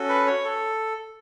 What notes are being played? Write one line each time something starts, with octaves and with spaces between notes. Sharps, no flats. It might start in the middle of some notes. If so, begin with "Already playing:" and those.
Already playing: C#4 F#4 A4
B4
C#5
A4